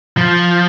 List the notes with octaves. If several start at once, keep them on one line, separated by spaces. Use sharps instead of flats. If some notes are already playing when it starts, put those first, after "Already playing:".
F3